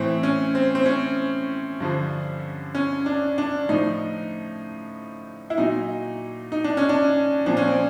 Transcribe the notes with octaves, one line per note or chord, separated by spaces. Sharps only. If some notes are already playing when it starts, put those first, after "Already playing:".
Already playing: A2 E3 C4
C#4
C4
C4
C#4
G2 D3 F3
C#4
D4
D4
A2 F3 D#4
E4
A#2 F#3 D#4
D#4
D4
C#4
D4
A#2 F3 D4
C#4
C4